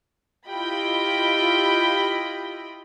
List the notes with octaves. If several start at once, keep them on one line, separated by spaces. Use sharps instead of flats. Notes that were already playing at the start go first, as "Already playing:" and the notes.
E4 F4 G4 D#5 G5 B5